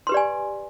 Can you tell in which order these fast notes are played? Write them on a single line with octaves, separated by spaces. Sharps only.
C6 B4 G4 D5 G#5